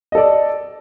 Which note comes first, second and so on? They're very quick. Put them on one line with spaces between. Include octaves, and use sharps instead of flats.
D#5 A4 D5